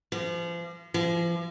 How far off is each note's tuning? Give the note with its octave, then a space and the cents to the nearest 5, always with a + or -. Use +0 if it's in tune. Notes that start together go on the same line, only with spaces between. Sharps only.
F3 -35
F3 -40